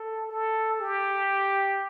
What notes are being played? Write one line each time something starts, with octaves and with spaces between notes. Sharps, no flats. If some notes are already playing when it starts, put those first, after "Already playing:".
Already playing: A4
A4
G4